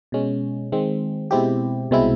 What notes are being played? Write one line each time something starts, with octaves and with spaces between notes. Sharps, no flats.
B2 G#3 C#4
D#3 G#3 C4
B2 G#3 C4 E4 G4
C2 B2 G#3 C4 E4